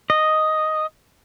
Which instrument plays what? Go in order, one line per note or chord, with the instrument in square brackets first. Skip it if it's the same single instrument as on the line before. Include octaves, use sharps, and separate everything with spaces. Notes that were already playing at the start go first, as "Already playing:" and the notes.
[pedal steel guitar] D#5